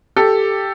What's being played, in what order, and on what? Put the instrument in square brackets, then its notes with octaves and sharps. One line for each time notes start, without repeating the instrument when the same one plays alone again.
[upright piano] G4 A4